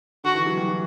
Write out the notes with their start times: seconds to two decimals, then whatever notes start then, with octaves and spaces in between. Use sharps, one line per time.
0.24 D3 F#4
0.35 E3
0.46 F#3
0.57 G3
0.68 E3